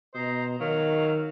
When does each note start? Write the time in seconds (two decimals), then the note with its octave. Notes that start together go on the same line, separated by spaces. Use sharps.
0.15 B2 C5 D#5 A#5
0.60 D#3 F#3 F5